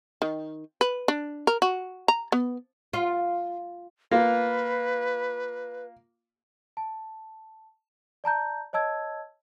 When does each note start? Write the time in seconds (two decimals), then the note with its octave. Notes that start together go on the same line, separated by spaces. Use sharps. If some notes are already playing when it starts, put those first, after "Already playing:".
0.22 D#3
0.81 B4
1.08 D4
1.47 A#4
1.62 F#4
2.08 A#5
2.32 B3
2.93 F4
4.11 A#3 F4 B4
6.77 A5
8.24 D5 A5 A#5 G6
8.73 C#5 D#5 A5 E6 G#6